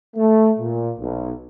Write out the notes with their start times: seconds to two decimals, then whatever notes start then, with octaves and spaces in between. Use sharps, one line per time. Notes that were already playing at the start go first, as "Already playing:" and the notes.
0.17 A3
0.59 A#2
0.99 B1